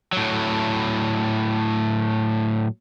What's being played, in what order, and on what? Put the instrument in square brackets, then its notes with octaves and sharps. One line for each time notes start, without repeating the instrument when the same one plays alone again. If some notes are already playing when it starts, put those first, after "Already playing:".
[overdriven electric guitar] A2 F#3